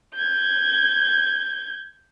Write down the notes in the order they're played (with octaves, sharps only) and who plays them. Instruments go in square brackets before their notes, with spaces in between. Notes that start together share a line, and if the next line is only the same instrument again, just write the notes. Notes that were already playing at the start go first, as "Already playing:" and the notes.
[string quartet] G6 G#6